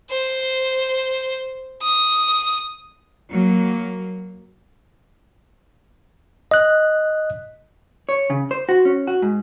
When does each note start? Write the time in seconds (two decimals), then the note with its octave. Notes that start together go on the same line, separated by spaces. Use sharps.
0.11 C5
1.83 D#6
3.31 F#3 A#3
6.51 D#5 F#6
8.09 C#5
8.30 C#3
8.51 C5
8.69 F#4
8.85 C#4
9.07 F#4
9.22 G#2